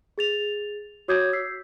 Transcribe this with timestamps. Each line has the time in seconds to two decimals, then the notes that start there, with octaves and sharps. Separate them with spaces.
0.18 G#4 A6 F7
1.08 F#4 C#5 D6 D#6 G6 G#6
1.33 E6 B6 C7